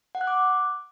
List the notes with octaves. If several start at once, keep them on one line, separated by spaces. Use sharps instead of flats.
F#5
F#6
D6